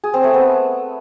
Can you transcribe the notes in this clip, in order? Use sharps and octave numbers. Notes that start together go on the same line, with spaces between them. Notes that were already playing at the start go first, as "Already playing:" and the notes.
G#4
C4
A3
B3